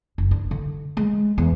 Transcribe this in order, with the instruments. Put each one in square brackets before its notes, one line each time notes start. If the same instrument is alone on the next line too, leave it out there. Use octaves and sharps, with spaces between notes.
[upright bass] F#1
D4
D3
G#3
E2